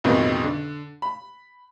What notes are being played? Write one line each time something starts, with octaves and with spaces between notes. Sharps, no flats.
A1 F2 G#2 B2 D#3 G3
D3
B5